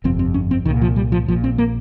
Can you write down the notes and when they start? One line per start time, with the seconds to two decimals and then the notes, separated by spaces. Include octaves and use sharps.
0.04 G1 F2 C3 C4
0.19 C4
0.34 C#4
0.51 C4
0.66 C2 A#2 D#3
0.82 F3
0.96 G3
1.12 F3
1.28 A#1 A#2 F3
1.44 C4
1.58 A#3